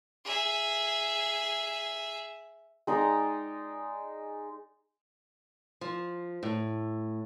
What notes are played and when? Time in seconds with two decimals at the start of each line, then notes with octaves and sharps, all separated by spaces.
0.24 G#4 E5
2.87 G#3 D#4 D5 A#5
5.81 F3
6.43 A2